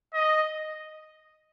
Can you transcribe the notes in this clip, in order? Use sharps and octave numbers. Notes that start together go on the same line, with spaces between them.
D#5